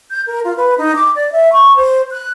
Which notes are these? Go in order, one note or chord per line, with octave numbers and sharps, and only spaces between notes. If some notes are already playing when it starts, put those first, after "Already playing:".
G6
A#4
F4
B4
D#4
D6
D5
E5
C#6
C5
F#6